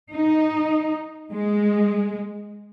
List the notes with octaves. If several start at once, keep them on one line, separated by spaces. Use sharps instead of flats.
D#4
G#3